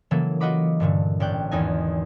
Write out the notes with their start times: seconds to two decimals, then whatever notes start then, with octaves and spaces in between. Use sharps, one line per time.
0.11 C#3 E3 F#3 A#3 A4
0.40 F4 F#4 D#5 F#5 B5 D6
0.80 G2 A#2 D3 A3
1.20 A1 D5 G5 F#6
1.51 G#1 E2 D#4 G#5